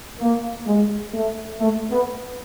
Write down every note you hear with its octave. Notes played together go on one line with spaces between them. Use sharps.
A#3
G#3
A3
A3
B3